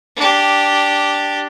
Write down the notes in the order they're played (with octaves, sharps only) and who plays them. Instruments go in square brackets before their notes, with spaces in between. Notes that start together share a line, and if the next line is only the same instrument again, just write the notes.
[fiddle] D4 G4